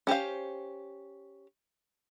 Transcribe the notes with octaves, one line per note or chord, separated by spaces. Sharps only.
C#4 G4 C5 F5